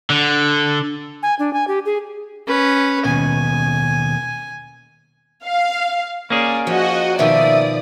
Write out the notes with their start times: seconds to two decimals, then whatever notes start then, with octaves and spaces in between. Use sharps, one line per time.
0.10 D3
1.23 G#5
1.39 D4
1.53 G#5
1.68 G4
1.86 G#4
2.47 C#4 B4
3.05 D#2 B2 G#5
5.44 F5
6.30 A#3 C#4 G#4 D5
6.67 F3 F#4 D#5 F#5
7.19 B2 D#3 F3 D5 E5 D#6